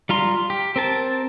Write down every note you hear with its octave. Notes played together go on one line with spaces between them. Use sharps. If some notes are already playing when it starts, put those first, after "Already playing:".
G3 F4 A#5 C6
G4
C4 A#4 A5